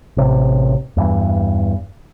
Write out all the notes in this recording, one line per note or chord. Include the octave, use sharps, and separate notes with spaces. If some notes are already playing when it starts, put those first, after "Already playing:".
A1 C3
E2 G2 E3